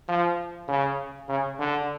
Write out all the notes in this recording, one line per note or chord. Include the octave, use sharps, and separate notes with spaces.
F3
C#3
C#3
D3